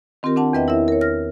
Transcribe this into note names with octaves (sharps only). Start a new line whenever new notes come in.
D#3 C4 F4 G4 A#4
C4 D4 F#5 A5
E2 B3 B4 D#5 E5 G5
E4 A#4 C#5 E5
A#4 C#5
E2 F6 A#6